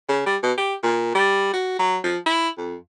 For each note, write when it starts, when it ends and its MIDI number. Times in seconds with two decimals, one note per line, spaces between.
0.09 0.21 49
0.26 0.37 55
0.43 0.52 47
0.58 0.75 67
0.83 1.12 46
1.15 1.50 55
1.54 1.76 66
1.79 1.98 54
2.04 2.18 53
2.26 2.49 64
2.58 2.75 41